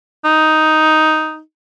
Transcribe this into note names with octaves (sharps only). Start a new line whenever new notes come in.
D#4